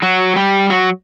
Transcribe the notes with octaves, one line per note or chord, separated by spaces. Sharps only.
F#3 F#4
G3 G4
F#3 F#4